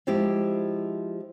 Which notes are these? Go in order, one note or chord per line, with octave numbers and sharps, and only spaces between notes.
F3 G#3 E4 G4